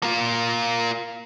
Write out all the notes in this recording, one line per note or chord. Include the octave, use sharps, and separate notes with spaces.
A#3 F4